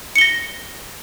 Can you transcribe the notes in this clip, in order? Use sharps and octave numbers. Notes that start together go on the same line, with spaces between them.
A#6 C#7 G7